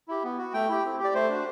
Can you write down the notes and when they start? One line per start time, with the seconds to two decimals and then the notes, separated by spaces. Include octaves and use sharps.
0.08 E4 G4
0.23 B3
0.38 F#4
0.53 A3 G5
0.69 E4 G4
0.84 C4
0.99 G4
1.04 D5
1.14 A3 C5
1.29 D4 F#4